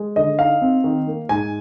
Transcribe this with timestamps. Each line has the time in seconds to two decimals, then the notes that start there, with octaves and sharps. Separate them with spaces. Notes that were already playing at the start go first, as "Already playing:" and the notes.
Already playing: G#3
0.16 D3 D#5
0.39 D#4 F5
0.62 C4
0.84 D#3
1.07 A#3
1.29 G#2 G#5